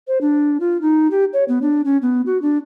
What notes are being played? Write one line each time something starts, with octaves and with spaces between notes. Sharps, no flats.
C5
D4
F4
D#4
G4
C#5
B3
D4
C#4
B3
F#4
D4